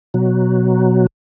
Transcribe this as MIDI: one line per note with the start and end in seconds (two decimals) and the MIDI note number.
0.14 1.07 47
0.14 1.07 54